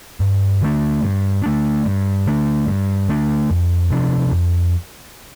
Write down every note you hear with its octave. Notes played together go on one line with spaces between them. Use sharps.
G2
D3 A3 D4
G2
D3 A3 D4
G2
D3 A3 D4
G2
D3 A3 D4
F2
C3 F3 D4
F2